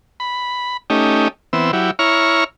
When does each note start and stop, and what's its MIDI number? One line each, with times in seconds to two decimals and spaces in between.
0.20 0.77 83
0.90 1.28 57
0.90 1.28 61
0.90 1.28 63
0.90 1.28 67
1.53 1.71 52
1.53 1.71 59
1.53 1.71 60
1.53 1.71 88
1.73 1.91 54
1.73 1.91 64
1.73 1.91 67
1.99 2.44 64
1.99 2.44 73
1.99 2.44 82
1.99 2.44 85
1.99 2.44 89